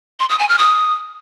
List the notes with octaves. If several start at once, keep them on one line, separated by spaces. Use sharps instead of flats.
C6
D#6
G#5
F6
D#6